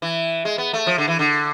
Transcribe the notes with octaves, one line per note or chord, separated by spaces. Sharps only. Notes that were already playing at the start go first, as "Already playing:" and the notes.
E3
G#3
B3
A3
F3
D3
E3
D3